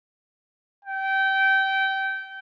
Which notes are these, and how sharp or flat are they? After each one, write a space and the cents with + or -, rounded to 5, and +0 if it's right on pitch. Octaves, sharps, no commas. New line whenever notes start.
G5 -20